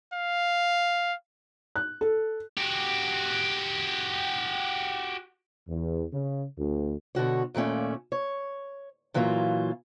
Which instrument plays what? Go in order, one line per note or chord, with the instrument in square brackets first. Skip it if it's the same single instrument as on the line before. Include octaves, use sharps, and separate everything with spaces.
[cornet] F5
[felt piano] F#6
A4
[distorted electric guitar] F#4 G4
[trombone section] E2
C#3
D2
[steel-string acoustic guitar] B2 D3 F#4 C#5
D#2 A#2 A3 C#4 D5
C#5
A#2 E3 F#3 A#3 F4